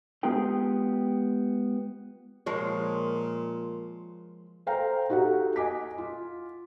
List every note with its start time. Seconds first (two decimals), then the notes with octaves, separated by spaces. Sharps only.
0.23 G#3 B3 F4 G4 G#4 G5
2.46 A#2 F3 G#3 C#5
4.66 A4 C5 F5 G5 A#5
5.09 D#4 F#4 G4 A4 F#5
5.56 D#5 G#5 D6 B6
5.98 F4